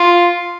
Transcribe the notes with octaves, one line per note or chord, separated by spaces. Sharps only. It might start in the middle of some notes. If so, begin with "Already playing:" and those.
Already playing: F4